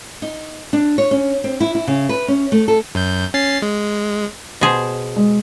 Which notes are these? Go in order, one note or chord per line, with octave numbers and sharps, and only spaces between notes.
D#4
D4
C#5
C#4
C4
E4
E4
C#3
B4
C#4
A3
A4
F#2 G6
C#4 A6 C7
G#3
B2 G#4 C5
G#3